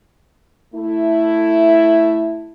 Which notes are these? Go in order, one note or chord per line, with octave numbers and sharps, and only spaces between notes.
A3 E4